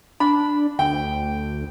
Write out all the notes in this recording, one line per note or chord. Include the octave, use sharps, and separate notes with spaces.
D4 B5
D2 G5